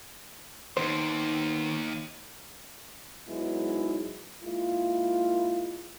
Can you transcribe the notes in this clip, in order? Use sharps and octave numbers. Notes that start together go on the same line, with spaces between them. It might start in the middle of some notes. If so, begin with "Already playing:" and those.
D#2 D#3 B3 C5
G#2 F#3 G#3 B3 D#4 E4
G#3 A#3 E4 F4